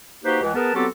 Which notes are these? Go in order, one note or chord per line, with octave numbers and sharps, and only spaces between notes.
A#3 D#4 F#4 G4 B4 C5
C#2 E3
B3 G#4 A#4 B4 A5
F#3 B3 C4 F#4 G4 A4